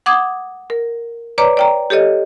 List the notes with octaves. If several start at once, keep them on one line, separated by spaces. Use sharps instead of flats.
F#5 D6 D#6 G#6
A#4
B4 C#5 D5 A#5 D6
D5 G5 A#5
G4 A4 C#5 D#5